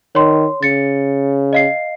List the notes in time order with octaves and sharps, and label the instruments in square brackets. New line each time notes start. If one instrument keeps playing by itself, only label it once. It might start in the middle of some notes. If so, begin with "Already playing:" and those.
[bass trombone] D#3 [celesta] C#5 C6
[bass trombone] C#3 [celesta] A6 C#7
[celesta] D#5 F5 C7